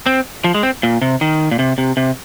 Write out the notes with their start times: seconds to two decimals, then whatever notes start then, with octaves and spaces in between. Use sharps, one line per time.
0.06 C4
0.44 F3
0.54 G#3
0.63 C4
0.83 A#2
1.02 C3
1.21 D#3
1.51 A#2
1.59 C3
1.78 C3
1.97 C3